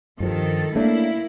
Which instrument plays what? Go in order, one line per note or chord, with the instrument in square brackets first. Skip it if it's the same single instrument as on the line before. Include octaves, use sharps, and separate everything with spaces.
[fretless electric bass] G2 F3 [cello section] D#3 A4
[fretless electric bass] A3 C#4 D4 [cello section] A#3 E4